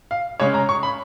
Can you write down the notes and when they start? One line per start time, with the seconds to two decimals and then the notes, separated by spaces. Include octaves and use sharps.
0.11 F5
0.40 C#3 G#3 C#4 C#5
0.54 A#5
0.69 C#6
0.83 B5